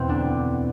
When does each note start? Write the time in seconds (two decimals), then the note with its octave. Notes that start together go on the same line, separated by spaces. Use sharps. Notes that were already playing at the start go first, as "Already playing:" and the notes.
Already playing: E2 B2 C4
0.08 D2 D4